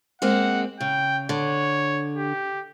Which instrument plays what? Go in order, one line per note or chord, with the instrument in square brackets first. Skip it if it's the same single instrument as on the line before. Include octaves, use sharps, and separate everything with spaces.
[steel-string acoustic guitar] G#3 A#3 C4 [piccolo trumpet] F#5
[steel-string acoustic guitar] C#3 [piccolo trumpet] G5
[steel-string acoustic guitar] D3 [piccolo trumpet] C#5
[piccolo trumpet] G4